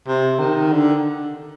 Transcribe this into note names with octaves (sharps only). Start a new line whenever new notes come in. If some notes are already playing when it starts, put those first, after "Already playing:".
C3
D#3
D3